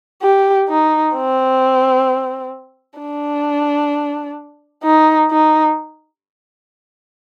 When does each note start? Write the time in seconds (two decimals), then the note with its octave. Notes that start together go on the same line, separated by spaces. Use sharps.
0.22 G4
0.68 D#4
1.15 C4
2.99 D4
4.84 D#4
5.30 D#4